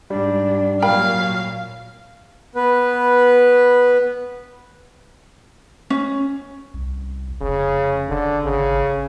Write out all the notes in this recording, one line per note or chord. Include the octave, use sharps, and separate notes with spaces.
G#2 G3 D4
A#2 F#3 A#4 F5 G5 B5
B3 B4
C#4
C2
F1 C#3
D3
G#1 C#3